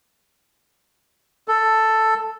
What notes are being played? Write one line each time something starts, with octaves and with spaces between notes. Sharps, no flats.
A4